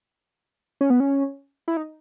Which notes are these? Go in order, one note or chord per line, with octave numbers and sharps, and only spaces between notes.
C#4
B3
C#4
E4
D#4